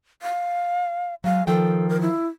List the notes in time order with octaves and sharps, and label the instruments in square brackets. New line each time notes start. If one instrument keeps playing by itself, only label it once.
[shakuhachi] F5
[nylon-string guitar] F#3 G#3 [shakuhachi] F5
[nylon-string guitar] D#3 F3 G5 [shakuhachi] A4
[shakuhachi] A#4
E4